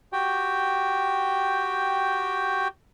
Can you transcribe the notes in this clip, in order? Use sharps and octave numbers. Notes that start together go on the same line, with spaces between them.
F#4 G4 G5